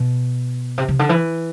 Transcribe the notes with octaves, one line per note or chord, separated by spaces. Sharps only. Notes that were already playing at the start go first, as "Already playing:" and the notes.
Already playing: B2
C3
C3
D3
E3